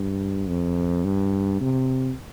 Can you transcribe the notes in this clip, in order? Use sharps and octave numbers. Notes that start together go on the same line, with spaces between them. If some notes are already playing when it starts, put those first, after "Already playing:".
Already playing: G2
F2
G2
C3